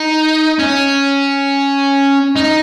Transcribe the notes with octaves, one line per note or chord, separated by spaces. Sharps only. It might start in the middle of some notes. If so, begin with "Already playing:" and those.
Already playing: D#4
C#4
D#4